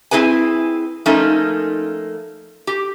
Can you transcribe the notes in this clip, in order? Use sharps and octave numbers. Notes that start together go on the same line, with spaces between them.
C4 E4 G#4 B4 G#5
F3 A3 A#3 C#4 D#4
G4